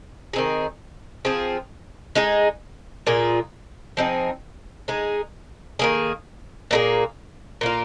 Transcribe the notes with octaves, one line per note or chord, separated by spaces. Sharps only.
D#3 C4 D#4 G#4
F3 C4 G#4
G#3 D#4 G#4
A#2 A#3 F4 G#4
F3 C4 D#4 G#4
G#3 D#4 G#4
D#3 A#3 G#4
A#2 A#3 D#4 G#4
A#2 A#3 F4